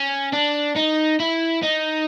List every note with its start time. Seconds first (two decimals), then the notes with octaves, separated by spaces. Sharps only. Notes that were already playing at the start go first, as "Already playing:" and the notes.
Already playing: C#4
0.33 D4
0.76 D#4
1.20 E4
1.63 D#4